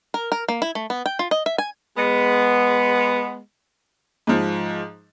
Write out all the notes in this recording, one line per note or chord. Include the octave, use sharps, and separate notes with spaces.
A#4
A#4
A#3
E4
A3
B3
G5
F4
D#5
E5
G#5
G#3 B3
G#2 F3